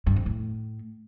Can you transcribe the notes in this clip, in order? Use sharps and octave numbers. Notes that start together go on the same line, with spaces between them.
G2
F2
A2